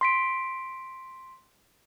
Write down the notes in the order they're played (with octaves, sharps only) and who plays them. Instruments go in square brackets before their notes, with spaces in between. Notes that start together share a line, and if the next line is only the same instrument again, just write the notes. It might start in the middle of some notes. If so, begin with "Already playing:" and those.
[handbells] C6 B6 D7